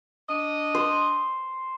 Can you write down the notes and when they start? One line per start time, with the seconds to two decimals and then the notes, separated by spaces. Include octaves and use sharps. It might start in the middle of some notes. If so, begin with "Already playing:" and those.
0.29 D4 D#5
0.75 C5